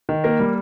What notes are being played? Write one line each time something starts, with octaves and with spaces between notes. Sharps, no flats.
D#3
A#3 A#4
G3